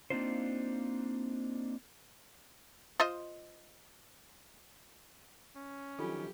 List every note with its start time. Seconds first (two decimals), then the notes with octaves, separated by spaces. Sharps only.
0.10 A#3 C4 D4 D#4 F4 C5
3.00 F4 C5 D#5
5.56 C#4
5.99 D#3 F3 F#3 D4 F4 G4 A4